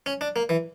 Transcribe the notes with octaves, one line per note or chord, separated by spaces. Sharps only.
C#4
D4
A#3
E3